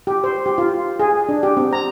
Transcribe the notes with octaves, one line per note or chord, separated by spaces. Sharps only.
G4
C5
G4
F4
G#4
D4
G4
C4
A#5